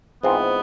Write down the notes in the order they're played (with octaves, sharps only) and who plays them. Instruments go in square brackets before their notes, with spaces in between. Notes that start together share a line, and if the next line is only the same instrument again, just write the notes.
[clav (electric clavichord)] G#2 E3 G#3 C4 F4 [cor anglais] B3